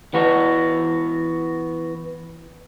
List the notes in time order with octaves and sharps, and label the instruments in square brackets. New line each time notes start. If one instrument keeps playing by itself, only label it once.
[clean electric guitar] E3 B3 F#4